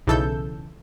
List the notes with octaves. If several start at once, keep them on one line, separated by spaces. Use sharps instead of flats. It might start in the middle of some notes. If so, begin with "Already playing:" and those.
B1 C#3 E3 A4 E6 G6